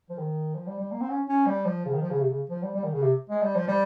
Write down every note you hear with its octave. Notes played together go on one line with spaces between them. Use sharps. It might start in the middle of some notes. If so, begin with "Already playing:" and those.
F3
D#3
F3
G3
G3
A#3
C4
C#4
C#4
G3
F3
C#3
D#3
F3
C#3
C3
C#3
F3
G3
G3
D#3
C#3
C3
G#3
G3
F3
G3